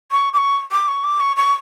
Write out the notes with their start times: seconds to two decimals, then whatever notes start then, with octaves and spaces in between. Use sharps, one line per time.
0.11 C#6
0.33 D6
0.37 C#6
0.71 D6
0.88 C#6
1.04 D6
1.20 C#6
1.36 C#6